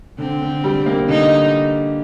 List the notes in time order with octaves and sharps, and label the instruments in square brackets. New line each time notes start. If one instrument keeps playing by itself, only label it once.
[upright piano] D3 [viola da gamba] C4
[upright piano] D3
G3
A#3
[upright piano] D3 [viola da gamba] D#4